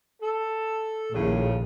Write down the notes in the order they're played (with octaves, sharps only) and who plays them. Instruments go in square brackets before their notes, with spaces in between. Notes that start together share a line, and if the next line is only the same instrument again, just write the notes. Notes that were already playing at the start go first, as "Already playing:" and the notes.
[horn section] A4
[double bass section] A#1 D#2 [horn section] A2 C#3